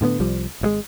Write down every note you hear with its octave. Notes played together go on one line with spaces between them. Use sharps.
A2 D3 A#3 B3
C2 F3 G3
G#1 C3 G#3